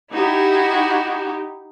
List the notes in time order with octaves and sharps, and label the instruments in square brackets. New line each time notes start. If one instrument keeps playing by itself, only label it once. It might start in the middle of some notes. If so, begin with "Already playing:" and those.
[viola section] D#4 G4 [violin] E4 F#4